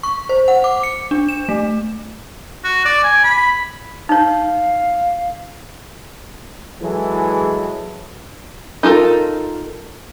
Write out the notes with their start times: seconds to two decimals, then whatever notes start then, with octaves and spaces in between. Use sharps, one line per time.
0.03 C#6
0.29 C5
0.48 F#5
0.64 D6
0.83 C#7
1.11 D4
1.28 E7
1.49 A3
2.64 F#4
2.85 D5
3.04 G#5
3.24 B5
4.09 D#4 C#5 F5
6.81 E3 F#3 G#3 E4 G#4 A4
8.83 D#4 F4 A4 A#4